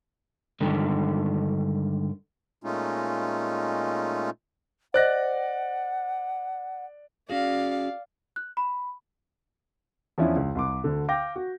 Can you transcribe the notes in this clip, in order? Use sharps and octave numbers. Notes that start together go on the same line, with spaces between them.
G2 D3 D#3 G#3
A#2 G#3 A3 C#4 D#4 F4
C5 D5 D#5 F#5 F#6 A#6
C#4 F#4 G#4 D5 F5
F#6
B5
E2 F3 C#4 D4 E4
C#2
C2 C6 D6
D2 D3
F5 G5 D6 G6 A#6
F#4